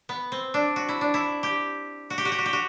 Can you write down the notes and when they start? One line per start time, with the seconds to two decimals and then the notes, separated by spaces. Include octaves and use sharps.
0.09 B3
0.32 C4
0.54 D4
0.76 F#4
0.89 E4
1.01 D4
1.14 E4
1.43 G4
2.10 F#4
2.18 G4
2.25 F#4
2.32 G4
2.39 F#4
2.46 G4
2.53 F#4